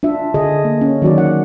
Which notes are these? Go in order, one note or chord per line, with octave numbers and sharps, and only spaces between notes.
D4 F4 E5
D3 G#4 D#5
A#3
C#4
D#3 F#3 F#4 D5
F#5